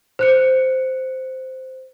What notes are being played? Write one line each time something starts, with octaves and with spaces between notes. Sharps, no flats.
C5 F#6 C#7